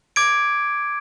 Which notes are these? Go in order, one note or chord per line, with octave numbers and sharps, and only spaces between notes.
D6 G#6 D7